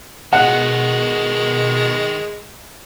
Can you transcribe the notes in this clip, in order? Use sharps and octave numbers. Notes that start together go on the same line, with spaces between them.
B2 D#3 G#3 F#4 F#5